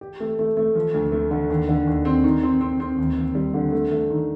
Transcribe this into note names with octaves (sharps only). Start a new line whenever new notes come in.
G4
A3
A3
A3
F3
D2
A3
D3
D#2
D3
D#2
C4
D#3
C4
C4
C4
D#2
D#2
G3
D3
A3
A3
D#3